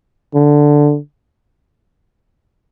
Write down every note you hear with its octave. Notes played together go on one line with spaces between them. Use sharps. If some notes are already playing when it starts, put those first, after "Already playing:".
D3